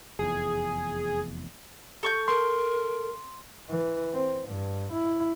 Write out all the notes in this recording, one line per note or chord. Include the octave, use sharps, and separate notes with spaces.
F1 E2 G#4
A4 C#6 G6
A#4 C6
E3
C4
G2
E4